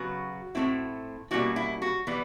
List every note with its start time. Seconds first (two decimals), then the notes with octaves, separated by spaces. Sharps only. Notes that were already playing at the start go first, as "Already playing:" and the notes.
Already playing: C#3 F#3 B3 F#4
0.55 A2 F3 A3 C4 E4
1.31 B2 G3 A#3 C#4 E4 F#4
1.56 E4
1.82 F#4
2.07 E3 G3 B3